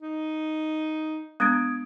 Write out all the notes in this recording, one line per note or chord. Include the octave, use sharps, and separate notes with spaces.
D#4
G#3 B3 D4 D#6 G#6 D7